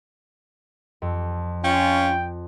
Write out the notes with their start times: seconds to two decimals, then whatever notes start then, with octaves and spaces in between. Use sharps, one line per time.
1.02 F2
1.64 C#4 F4 G5